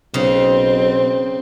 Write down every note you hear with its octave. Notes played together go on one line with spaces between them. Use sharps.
B1 C#3 C4